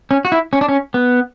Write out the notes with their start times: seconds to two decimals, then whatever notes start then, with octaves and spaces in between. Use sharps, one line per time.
0.11 C#4
0.25 F#4
0.32 E4
0.53 C#4
0.61 D4
0.69 C#4
0.94 B3